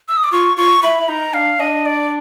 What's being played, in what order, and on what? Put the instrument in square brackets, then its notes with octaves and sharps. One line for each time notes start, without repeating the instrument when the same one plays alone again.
[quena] E6
D#6
D6
[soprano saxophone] F4 [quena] C#6
[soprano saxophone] F4 [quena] C#6
[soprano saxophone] E4 [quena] B5
[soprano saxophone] E4
[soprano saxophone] D#4 [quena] A#5
[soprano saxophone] D4 [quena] F5
[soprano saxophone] D4 [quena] D#5
[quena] D5